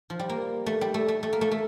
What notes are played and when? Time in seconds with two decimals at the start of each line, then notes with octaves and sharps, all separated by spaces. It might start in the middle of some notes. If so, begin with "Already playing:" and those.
0.10 F3
0.19 G3
0.29 A#3
0.66 A3
0.81 G3
0.94 A3
1.08 A3
1.23 A3
1.33 A#3
1.41 A3
1.51 A3